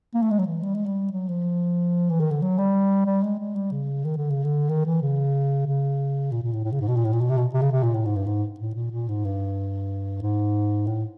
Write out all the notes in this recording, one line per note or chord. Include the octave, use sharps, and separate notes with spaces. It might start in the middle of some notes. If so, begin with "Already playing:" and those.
A#3
A3
G#3
F#3
E3
G3
G#3
G3
F#3
F3
E3
D#3
D3
F#3
G3
G3
G#3
G#3
G3
C#3
D#3
D3
C#3
D3
D#3
E3
C#3
C#3
A#2
A#2
A2
A2
C#3
G#2
B2
A#2
A2
A#2
B2
C3
B2
C3
C#3
C3
A#2
A2
G#2
G2
G#2
A2
A#2
A#2
G#2
G2
G#2
A2